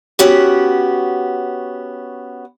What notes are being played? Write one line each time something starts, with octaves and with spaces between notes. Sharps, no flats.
B3 C#4 F#4 G4